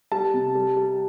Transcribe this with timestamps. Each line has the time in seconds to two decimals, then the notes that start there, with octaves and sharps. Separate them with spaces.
0.12 G3 A5
0.34 C3
0.55 G3
0.77 G3